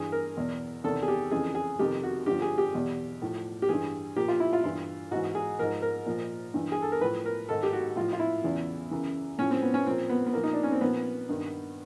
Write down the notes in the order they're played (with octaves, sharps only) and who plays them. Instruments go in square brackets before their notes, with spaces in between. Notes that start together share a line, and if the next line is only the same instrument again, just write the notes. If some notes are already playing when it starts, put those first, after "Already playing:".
Already playing: [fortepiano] G2 E3 G#4
A#4
E2 B2
E2 C3 D#3 A4
G#4
G4
F2 C#3 E3 G#4
G#4
F2 C3 D#3 G4
F#4
G2 D3 F3 G4
G#4
G4
E2 B2
A2 F3
G4
G2 E3 G#4
A#2 F3 G4
F4
E4
F4
G2 E3 F4
G#2 E3 F#4
G#4
G#2 F3 A#4
A#4
A#2 F3
G2 E3
G#4
A4
A#4
A2 F3 B4
A#4
G#2 D#3 A4
G4
F#4
A2 F3 F4
F4
E4
E2 C#3 E3
F#2 C#3 E3
A2 F3 C#4
C4
B3
C#4
A#2 F3 C4
B3
B3
A#2 F3 A#3
D#4
D4
C#4
C4
A#2 F3 B3
G2 D#3